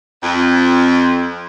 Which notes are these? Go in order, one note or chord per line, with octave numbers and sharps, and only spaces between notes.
F2